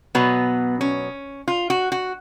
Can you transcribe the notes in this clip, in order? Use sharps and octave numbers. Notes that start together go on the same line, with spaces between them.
B2 F#3 B3
C#4
F4
F#4
F#4